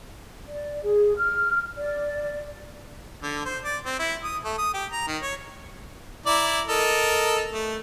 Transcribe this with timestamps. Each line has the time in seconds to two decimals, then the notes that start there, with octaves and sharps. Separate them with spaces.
0.48 D5
0.83 G#4
1.17 F6
1.77 D5
3.22 D3
3.45 C5
3.64 D5
3.85 C4
3.99 E4
4.24 D#6
4.44 A3
4.58 D#6
4.74 G4
4.92 A#5
5.07 D#3
5.22 C#5
6.26 E4 D5 A#5
6.67 A4 A#4 D#5
7.52 A3